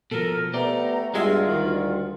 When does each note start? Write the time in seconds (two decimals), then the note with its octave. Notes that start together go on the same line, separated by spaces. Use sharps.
0.11 B2 F3 A4 A#4
0.54 A3 B3 G4 C5 D5 A#5
1.14 G2 G3 G#3 F4 F#4 E5
1.48 D2 D#3